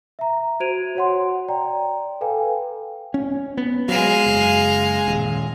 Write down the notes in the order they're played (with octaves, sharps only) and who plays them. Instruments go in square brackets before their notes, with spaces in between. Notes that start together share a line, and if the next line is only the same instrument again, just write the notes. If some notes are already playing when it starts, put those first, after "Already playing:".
[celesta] E5 A#5
F#4 C5 G#6 D7 D#7 F7
F#4 C#5 F#5 C6
D5 G5 A#5
A4 B4 F5 G5 G#5
[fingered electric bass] C#4
B3
[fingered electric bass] F#3 [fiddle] G#3 F5
[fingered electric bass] F#1
D#1